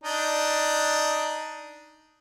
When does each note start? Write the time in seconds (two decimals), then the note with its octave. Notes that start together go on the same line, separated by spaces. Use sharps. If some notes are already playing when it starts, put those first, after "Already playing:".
0.04 D4 D#4